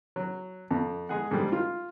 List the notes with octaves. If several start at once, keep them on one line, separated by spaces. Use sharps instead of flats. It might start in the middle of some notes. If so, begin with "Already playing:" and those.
F#3
F2
G#3 G#4 F#5
G#2 D3 G3
F4